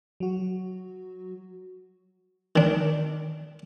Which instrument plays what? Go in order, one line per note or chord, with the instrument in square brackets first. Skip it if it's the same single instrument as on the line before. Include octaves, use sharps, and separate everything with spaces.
[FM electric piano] F#3 F#4
[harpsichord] D#3 D4